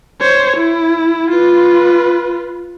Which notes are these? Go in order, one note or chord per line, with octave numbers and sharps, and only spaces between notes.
C5 C#5
E4
F4 B4